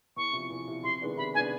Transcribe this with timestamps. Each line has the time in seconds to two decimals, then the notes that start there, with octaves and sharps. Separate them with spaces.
0.16 E2 C#6
0.33 C3 F3
0.50 E2
0.68 C3 F3
0.83 C3 C6
1.01 D#3 G#3 B3 D4
1.18 C3 B5
1.35 D#3 G#3 B3 D4 G#5